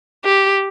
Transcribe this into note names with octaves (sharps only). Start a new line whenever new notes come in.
G4